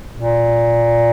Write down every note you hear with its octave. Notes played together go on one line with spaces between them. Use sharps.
A#2